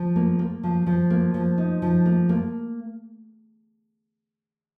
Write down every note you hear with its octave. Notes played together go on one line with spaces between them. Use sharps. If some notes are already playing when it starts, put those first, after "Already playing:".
Already playing: F3
A#3
A#3
F3
F3
A#3
F3
D#4
F3
A#3
A#3